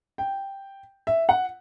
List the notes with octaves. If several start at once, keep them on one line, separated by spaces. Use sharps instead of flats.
G5
E5
F#5